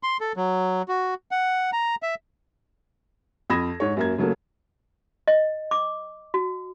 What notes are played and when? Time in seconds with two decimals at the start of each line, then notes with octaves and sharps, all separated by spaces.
0.03 C6
0.21 A4
0.36 F#3
0.89 F#4
1.31 F#5
1.73 A#5
2.03 E5
3.50 F2 B5 D#6 G#6 A#6 E7
3.80 G#2 C#5
3.97 F#2 A#3 G#6
4.18 C#3 F#3 A3 A#3
5.28 D#5
5.71 D6
6.34 F#4